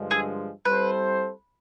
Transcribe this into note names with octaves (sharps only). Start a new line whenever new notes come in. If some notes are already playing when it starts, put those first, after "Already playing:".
Already playing: G2 D3 F3 G#3
G#4
G3 C4 E4 A4 B4 C5